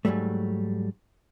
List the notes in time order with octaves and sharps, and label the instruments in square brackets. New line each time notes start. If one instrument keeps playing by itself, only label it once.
[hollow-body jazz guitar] G#2 C#3 F#3 G3 A3